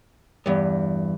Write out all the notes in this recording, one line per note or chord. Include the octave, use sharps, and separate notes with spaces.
E2 G2